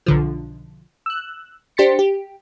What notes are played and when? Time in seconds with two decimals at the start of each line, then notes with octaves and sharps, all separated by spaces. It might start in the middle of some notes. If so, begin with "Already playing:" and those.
0.06 B1 D3 F3
1.06 E6 F#6
1.77 D4 G4 C5 A6 B6 C#7
1.99 G4